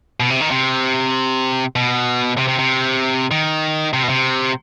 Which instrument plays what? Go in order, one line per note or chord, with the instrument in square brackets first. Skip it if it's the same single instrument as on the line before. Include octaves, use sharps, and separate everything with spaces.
[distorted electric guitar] B2
C3
D#3
C3
B2
C3
C3
C3
D#3
C3
B2
C3